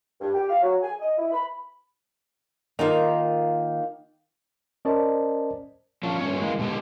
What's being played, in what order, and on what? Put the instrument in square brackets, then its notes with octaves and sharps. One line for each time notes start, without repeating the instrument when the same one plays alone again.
[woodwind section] G2
G4
F5
F#3
G#5
D#5
E4
B5
[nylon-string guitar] D#3 A4 A#4 [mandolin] A#3 F4 A#5 [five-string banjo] D#4
[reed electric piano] C#4 A#4 C5 D5 D#5 A5
[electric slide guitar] F3 C#4 D4
G2 C#4 C#5
E3 G#3 A#3
B2 D3 G#3 G4 G#4